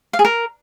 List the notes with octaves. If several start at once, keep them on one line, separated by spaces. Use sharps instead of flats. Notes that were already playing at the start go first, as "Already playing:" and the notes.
F5
G#4
A#4